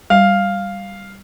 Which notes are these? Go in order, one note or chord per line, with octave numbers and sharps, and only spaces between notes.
G3 F5